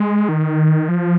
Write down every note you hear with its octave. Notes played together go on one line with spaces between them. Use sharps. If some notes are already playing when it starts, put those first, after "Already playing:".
Already playing: G#3
D#3
F3